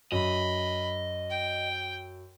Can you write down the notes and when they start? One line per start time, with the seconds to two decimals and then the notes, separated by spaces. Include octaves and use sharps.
0.12 F#2 D#5 B5
1.30 G5